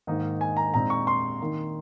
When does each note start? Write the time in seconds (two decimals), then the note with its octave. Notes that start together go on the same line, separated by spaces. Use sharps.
0.07 G#2 D#3 A#3 D#4
0.41 G#5
0.57 A#5
0.74 A#2 G#3 C4 D#4 A#5
0.90 C#6
1.07 C6
1.40 D#3 A#3 D#4